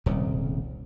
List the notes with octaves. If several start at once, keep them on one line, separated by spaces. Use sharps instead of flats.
D#1 C2 G#2 C#3